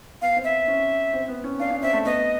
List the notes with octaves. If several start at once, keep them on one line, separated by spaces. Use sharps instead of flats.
B3 F5
C4
E5
C#4
C4
B3
C#4
D4 F5
C#4
C4 E5
A3
B3 D#5